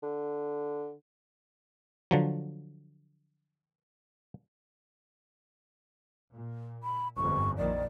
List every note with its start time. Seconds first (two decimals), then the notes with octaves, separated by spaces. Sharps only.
0.03 D3
2.11 D3 F3 F#3
6.33 A#2
6.83 B5
7.17 G1 F2 G#2 C#6
7.58 A#1 D#3 D5